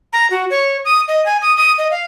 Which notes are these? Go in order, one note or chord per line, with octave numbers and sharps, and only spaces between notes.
A#5
F#4
C#5
D#6
D#5
G#5
D#6
D#6
D#5
F5